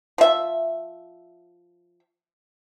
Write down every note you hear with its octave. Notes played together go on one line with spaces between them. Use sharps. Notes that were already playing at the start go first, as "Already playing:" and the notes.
F3 E5